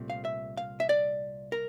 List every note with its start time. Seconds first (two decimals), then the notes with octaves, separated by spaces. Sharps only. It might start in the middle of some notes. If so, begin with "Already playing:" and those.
Already playing: C2 A#2 A3 C4
0.10 F5
0.25 E5
0.57 F5
0.80 E5
0.89 D5
1.52 A#4